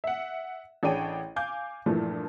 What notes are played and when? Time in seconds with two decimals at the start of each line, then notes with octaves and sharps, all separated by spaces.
0.04 E5 F#5
0.83 A1 D4 G#4 C#5 G5 D#7
1.36 F5 G#5 D6 G6
1.86 G2 A#2 E3 F3 A3